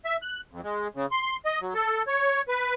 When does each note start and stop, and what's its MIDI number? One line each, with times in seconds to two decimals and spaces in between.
0.05 0.17 76
0.22 0.41 90
0.52 0.61 41
0.64 0.88 56
0.95 1.06 49
1.11 1.36 84
1.45 1.60 75
1.61 1.74 54
1.75 2.02 69
2.07 2.42 73
2.48 2.74 71